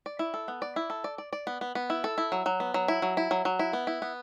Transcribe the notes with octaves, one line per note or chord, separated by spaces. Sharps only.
D5
E4
A4
B3
D5
E4
A4
D5
D5
D5
B3
B3
B3
E4
A4
E4
F#3
F#3
B3
F#3
E4
F#3
E4
F#3
F#3
E4
B3
E4
B3